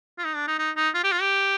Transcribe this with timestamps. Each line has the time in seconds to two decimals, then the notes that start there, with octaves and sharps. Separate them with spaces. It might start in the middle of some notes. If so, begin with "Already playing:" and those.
0.19 F4
0.24 D#4
0.35 D4
0.48 D#4
0.59 D#4
0.77 D#4
0.94 F4
1.04 G4
1.12 F4
1.21 G4